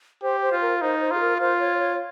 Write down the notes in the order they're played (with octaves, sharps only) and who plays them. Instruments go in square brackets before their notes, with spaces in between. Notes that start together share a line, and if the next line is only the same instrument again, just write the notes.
[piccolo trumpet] G4 [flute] C5
[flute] C5
[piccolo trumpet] F4
[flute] A#4
[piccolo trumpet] D#4 [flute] C5
[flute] C5
[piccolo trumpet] F4 [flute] G#4
[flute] A#4
[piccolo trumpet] F4 [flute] C5
[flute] C#5
C#5